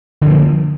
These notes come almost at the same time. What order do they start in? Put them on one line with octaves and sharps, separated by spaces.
D3 F3 A#3